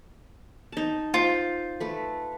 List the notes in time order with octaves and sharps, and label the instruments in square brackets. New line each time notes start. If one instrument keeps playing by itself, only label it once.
[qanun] D#4 A5
[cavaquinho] F4 [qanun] C5
[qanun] A3 B4